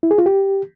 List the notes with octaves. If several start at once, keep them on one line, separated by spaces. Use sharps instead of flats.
E4
G#4
F4
G4